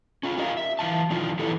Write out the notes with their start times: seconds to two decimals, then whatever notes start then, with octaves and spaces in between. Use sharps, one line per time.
0.23 C#4 F4
0.38 F4 G4 A#4 D5 D#5 F5
0.57 E5
0.79 E3 A#3 F5 A5
1.10 D#3 F3 D4 D#4 F4
1.39 E3 D4 E4 G4 A4